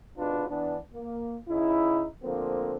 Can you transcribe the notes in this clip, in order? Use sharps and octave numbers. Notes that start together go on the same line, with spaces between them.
G#1 B2 D4 F4 B4
E3 B3 D4
A#3
C#3 D#4 E4
D3 F3 A3 A#3 C4